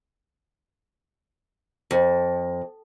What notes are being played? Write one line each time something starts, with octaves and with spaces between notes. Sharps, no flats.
F2